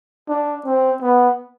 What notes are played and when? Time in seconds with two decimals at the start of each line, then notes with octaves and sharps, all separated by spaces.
0.28 D4
0.65 C4
1.02 B3